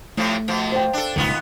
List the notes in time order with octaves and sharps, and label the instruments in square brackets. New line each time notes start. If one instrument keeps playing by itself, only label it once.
[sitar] A2 C3 F3 [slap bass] A3
[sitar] B2 F3
[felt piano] C5 G5
[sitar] D4 A4
[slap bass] D#1 C#2 D3 [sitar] D#3 B3 F4